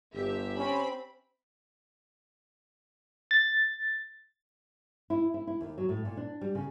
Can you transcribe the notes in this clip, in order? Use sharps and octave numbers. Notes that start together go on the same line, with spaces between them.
G1 G4 E5
C4 C#4 B5
A6
E4
E4
E4
D#2
F#3
A2
A#2
D4
G3
C#3